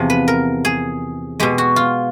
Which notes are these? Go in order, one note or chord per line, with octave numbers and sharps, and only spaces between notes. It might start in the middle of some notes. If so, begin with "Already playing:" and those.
Already playing: E2 C3 F3
B4
A#4
G#4
B2 G#3 G4
F#4
F4